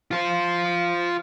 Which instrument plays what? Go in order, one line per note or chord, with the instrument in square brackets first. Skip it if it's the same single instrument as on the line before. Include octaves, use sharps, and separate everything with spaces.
[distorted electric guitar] F4 C5